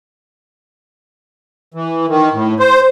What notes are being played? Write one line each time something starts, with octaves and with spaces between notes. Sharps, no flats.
E3
D#3
A2
C5